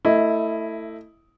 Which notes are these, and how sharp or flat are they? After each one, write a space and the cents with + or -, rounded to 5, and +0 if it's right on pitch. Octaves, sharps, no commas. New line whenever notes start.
A3 +20 E4 +0 D#5 +10